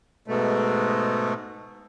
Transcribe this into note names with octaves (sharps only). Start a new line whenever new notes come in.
G#2 B2 A3